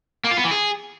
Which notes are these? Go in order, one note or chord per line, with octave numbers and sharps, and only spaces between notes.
A#3
F4
B3
E3
G#4